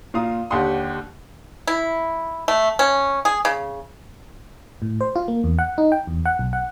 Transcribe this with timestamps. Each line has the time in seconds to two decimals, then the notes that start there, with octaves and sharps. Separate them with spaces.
0.14 A#2 F4 F5 A#5 D#6
0.51 D#2 D3 G4 F#5 C6 D#6
1.67 E4
2.48 A3
2.79 C#4
3.25 G#4
3.45 C#3
4.82 A2
5.01 C5
5.16 F4
5.28 A#3
5.44 E2
5.59 F#5
5.78 D#4
5.92 G5
6.07 E2
6.26 F#5
6.39 B1
6.53 F#5